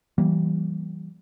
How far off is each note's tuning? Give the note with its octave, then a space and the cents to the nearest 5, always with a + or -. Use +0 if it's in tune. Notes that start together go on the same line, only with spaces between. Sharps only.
E3 +0 G3 -25 A#3 +0